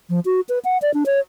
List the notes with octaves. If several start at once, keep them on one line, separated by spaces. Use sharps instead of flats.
F3
F#4
B4
F#5
D5
D4
C#5